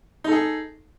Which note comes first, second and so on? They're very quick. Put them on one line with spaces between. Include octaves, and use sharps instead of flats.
D#4 A4 G#4